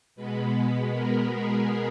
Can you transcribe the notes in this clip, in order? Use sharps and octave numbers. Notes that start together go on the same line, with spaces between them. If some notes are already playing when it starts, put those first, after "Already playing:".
B2 G#3 B3 B4
A#4
G#4